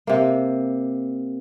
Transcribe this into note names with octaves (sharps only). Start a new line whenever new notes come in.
C3 A#3